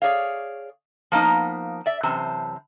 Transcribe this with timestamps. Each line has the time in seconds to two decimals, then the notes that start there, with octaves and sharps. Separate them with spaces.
0.02 G#4 C#5 D5 F5
1.12 F3 A#3 B3 D#4
1.86 D5 E5
2.03 F#2 C3 E3 C5 A5